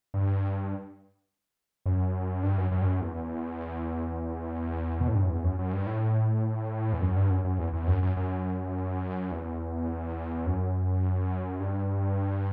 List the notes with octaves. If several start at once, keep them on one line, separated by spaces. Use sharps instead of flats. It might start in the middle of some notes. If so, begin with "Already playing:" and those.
G2
F#2
G2
F#2
F#2
G2
F#2
E2
B2
A2
G2
F#2
E2
F#2
F#2
G2
A2
E2
F#2
G2
F#2
F#2
E2
E2
F#2
F#2
F#2
E2
F#2
G2